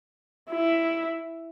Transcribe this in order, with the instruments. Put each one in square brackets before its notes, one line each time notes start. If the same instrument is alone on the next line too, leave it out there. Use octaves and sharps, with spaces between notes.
[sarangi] E4